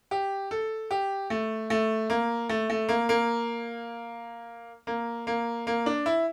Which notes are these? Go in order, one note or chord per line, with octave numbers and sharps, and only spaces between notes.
G4
A4
G4
A3
A3
A#3
A3
A3
A#3
A#3
A#3
A#3
A#3
D4
E4